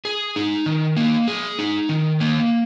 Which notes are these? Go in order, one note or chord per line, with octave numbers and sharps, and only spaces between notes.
G#4
D#4
D#3
A#3
G#4
D#4
D#3
A#3